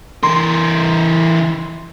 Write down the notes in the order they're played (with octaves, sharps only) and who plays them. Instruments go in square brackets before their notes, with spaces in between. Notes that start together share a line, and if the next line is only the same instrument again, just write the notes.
[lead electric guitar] E3 A#4 [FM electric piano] C6